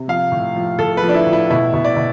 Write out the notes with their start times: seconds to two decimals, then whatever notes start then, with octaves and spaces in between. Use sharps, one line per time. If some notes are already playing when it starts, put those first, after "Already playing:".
Already playing: C3
0.08 F3 F5
0.32 A2
0.56 F3
0.79 A2 A4
0.97 B4
1.03 F3
1.09 D4
1.14 E4
1.26 A2
1.33 E4
1.50 B2 E4
1.74 B2
1.85 D5
1.96 B2